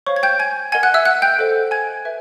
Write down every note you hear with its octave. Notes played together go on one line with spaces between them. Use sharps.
C5 C#5 F5 C#6
G#6
G5 G6
G#5 G#6
A#4 D#5 F#5 G#5 G#6
F#5 F#6
E5 E6
F#5 F#6
G5 G6
A4 C5 D#5
G#5 G#6
B4 E5